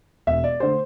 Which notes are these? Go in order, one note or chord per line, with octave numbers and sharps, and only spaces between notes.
E1 E5
D5
D3 A3 C5